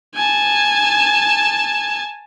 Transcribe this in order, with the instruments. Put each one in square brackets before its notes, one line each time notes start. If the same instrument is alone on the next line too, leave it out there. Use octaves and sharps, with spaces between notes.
[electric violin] G#5 A5